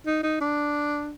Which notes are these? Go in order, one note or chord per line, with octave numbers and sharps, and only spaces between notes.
D#4
D#4
D4